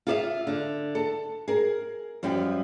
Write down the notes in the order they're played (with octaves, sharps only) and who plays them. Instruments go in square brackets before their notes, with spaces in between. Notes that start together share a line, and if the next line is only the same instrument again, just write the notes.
[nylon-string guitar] F4 G#4 A4 D5 E5 F5
D3
A4
G#4 A#4
F#2 F3 G3 G5